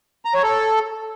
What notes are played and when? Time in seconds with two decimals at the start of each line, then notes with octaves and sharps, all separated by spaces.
0.25 A#5
0.34 C#5
0.43 A4